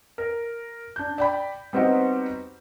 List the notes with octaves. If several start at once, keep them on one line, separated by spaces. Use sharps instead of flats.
A#4
D4 G6
D5 G5 B5
G3 B3 C4 D#4 F#4 C5